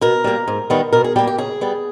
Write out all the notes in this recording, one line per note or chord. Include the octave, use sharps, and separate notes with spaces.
B2 A#4
G3 A#3
G#2
D#3 G3 B3
B2 A#4
G#4
G3 A#3 G4
G4
C#3 G#4
G3 B3